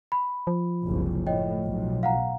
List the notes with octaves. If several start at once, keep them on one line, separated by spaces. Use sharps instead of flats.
B5
F3
F#1 C2
A2 C#5 D#5 G5
B1
F5 F#5 A#5